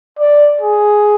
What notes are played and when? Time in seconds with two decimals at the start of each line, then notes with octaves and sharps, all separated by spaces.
0.19 D5
0.61 G#4